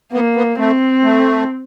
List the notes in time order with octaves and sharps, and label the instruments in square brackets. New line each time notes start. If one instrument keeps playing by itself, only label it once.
[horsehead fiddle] A#3 [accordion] B3
[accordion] B3
[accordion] A3 [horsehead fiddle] C4
[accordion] A3